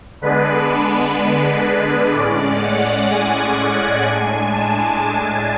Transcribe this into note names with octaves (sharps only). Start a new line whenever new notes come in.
D3 G#3 B3 D4 B4
A2 G#3 C#4 D5
F#5
G#5
A2 G#3 D4
A5
A5